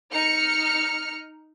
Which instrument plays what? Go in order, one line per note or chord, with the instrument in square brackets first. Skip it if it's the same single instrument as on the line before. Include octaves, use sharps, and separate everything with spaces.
[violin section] D#4 F6 C#7